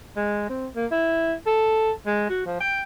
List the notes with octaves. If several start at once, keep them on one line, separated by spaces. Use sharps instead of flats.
G#3
C4
A#3
E4
A4
G#3
F#4
F3
G5